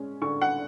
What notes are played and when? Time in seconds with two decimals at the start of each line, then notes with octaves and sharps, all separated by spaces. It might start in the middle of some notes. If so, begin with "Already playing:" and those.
Already playing: G#3 C#4
0.22 D3 C#6
0.41 F#5